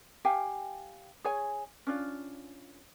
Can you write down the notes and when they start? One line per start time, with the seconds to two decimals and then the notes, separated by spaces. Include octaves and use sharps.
0.25 G4 F5 G5 G#5
1.24 G#4 C#5 G#5
1.87 C#4 D4 F4